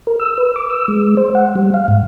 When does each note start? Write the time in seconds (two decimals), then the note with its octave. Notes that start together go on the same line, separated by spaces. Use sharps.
0.07 A#4
0.19 E6
0.38 B4
0.56 D6
0.70 E6
0.88 G#3
1.17 C5
1.35 F#5
1.55 G3
1.74 F5
1.88 G#2